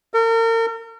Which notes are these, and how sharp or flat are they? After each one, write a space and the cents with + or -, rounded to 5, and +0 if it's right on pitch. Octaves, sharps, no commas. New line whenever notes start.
A#4 -40